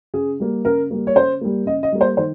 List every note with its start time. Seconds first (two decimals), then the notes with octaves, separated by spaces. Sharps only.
0.14 C#3 G#4
0.40 G3 A#3
0.65 C#3 A#4
0.91 G3 A#3
1.07 C#5
1.16 C#3 C5
1.41 G3 A#3
1.66 C#3 D#5
1.83 D#5
1.92 G3 A#3
2.01 C5
2.17 D#3 C5